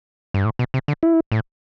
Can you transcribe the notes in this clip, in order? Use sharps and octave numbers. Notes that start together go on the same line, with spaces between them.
G2
A2
B2
C3
D3
E4
A2